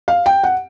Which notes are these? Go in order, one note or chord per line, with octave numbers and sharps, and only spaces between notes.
F5
G5
F#5